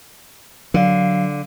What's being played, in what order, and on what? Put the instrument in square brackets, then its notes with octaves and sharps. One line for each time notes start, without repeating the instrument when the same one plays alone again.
[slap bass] D3 [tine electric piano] F#3 [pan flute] F5